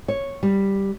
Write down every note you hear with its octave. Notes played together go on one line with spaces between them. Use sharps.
C#5
G3